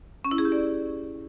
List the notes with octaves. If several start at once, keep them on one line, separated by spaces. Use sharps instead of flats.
C#4
E4
G#4
G4
D5